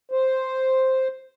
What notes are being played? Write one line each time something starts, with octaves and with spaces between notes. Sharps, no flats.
C5